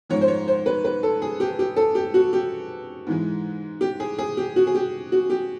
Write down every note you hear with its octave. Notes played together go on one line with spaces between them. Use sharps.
G#2 F3 G#3 C#5
C5
C#5
C5
B4
B4
A4
G#4
G4
G4
A4
G4
F#4
G4
G#2 E3 G#3
G4
G#4
G#4
G4
F#4
G#4
G4
F#4
G4